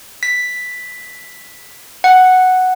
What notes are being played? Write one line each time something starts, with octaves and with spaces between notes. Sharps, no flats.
B6
F#5